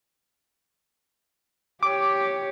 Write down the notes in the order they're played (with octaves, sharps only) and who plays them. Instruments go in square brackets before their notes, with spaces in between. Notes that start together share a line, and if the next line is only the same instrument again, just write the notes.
[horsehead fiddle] G4 C#5 [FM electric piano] D6